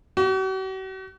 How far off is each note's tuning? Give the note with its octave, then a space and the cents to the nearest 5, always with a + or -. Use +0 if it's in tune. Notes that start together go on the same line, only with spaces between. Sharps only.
F#4 +45